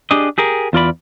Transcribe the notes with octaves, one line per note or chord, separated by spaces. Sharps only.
D4 G4 G#4 D#5
G4 G#4 A#4
E2 F4 D5 B5